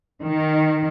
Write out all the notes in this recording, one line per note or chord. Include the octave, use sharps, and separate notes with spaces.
D#3